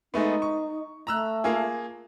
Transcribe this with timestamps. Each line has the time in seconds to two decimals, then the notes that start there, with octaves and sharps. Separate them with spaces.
0.14 G#3 A3 B3 D#4
0.42 C#6
1.07 A3 A#5 E6 F#6
1.44 A#3 F4 G#4